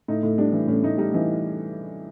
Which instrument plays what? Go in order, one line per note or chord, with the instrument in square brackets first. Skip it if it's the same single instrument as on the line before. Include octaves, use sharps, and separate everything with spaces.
[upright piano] A2 D#4
A2
G3 D4
E3
A2 C#4
A2 D#4
G3 D#4
E3 D#4